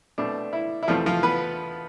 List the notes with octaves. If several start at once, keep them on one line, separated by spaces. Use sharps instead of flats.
B2 A3 C4 D4
E4
E4
E2 B2 F3 A3 C4 F4
F3 F4
B3 B4